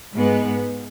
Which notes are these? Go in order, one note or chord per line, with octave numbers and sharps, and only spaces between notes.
G#2 G#3 B3